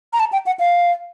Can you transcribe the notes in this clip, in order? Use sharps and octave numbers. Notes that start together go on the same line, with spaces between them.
A#5
A5
G5
F#5
F5